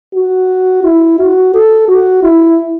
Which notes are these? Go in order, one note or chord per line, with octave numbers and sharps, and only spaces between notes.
F#4
E4
F#4
A4
F#4
E4